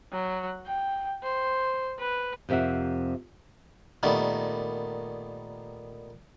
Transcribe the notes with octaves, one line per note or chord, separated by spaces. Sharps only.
F#3
G5
C5
B4
F2 C3 A#4 E5 F#5
A#2 D#3 G3 A3 B3